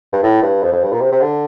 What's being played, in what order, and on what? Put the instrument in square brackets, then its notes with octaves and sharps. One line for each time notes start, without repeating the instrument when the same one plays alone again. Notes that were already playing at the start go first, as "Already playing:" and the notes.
[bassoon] G2
A2
G2
F2
F2
G2
A#2
C3
C3
D3